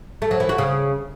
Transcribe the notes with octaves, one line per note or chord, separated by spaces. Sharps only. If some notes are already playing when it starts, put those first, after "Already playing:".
A3
F#3
E3
F#4
C#3